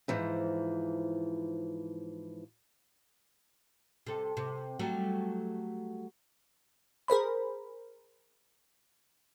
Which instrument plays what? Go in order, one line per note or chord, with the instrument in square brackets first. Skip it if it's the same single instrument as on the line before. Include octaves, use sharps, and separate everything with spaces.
[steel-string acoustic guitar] G#2 E3 F3
[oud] C3 A4
C3
F#3 G3 A3
[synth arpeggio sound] G#4 A#4 C5 B5